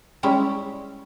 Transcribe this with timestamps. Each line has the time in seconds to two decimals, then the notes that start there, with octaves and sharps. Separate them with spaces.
0.23 G3 G#3 C#4 E4